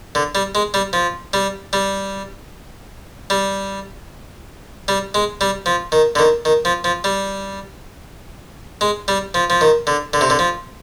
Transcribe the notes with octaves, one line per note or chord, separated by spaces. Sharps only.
D3
G3
G#3
G3
F3
G3
G3
G3
G3
G#3
G3
F3
D#3
D3
D#3
D#3
F3
F3
G3
G#3
G3
F3
F3
D#3
D3
D3
C3
D3
F3